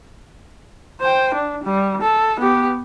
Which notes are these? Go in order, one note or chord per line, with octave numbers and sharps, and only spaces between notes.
C5 G5
D4
G3
A4
B3 G4